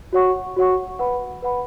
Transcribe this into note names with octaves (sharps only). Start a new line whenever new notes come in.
F#4 C#5 F#5 C#6
F#4 C#5 F#5 C#6
B4 F#5 B5
B4 F#5 B5